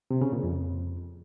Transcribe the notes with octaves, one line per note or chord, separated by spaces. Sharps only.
C3
C#3
A#2
F2